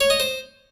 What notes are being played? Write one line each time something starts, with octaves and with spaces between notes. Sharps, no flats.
C#5
D#5
C5